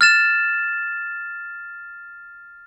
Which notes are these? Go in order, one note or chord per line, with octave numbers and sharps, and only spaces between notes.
F6 A6 E7